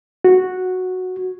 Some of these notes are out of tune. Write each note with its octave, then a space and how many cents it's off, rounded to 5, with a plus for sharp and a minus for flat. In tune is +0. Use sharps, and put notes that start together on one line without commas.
F#4 -5